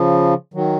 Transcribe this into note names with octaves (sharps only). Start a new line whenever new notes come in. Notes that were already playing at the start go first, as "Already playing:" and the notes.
Already playing: C#3 F3
D#3 F#3